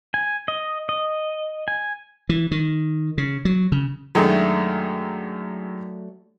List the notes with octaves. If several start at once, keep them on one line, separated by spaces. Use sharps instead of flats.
G#5
D#5
D#5
G#5
E3
D#3
C#3
F#3
C#3
F#2 D#3 F#3 G#3 A3 D4